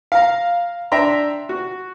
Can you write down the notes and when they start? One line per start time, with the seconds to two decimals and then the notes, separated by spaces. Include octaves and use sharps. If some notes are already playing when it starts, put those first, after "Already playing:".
0.12 F5 A#5
0.92 D4 E5 G5 A#5 C6
1.49 F#4